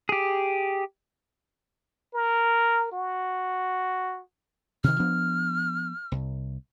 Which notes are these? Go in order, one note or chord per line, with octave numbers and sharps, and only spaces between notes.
G4 G#4
A#4
F#4
C3 D#3 F6
F3 B3 D4
C2